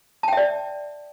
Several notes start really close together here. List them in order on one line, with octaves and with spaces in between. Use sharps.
A5 G5 E5 D5